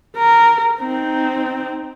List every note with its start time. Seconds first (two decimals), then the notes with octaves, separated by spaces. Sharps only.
0.16 A#4
0.80 C4 D#4